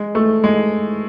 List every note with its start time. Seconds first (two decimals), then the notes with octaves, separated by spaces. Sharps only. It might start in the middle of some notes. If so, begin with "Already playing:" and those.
Already playing: G#3
0.15 A3
0.44 G#3